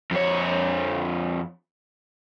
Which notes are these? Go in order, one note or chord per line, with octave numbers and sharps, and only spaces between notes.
F2 C#5